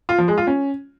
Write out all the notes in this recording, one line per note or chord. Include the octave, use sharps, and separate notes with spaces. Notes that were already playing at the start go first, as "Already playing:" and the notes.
F4
F3
G#3
F4
C#4